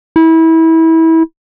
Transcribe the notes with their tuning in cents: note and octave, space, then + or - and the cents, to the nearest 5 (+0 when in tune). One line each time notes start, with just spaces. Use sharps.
E4 -25